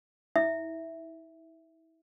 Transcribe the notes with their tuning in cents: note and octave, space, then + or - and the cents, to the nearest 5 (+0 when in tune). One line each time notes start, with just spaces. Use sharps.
E4 -35 E5 +0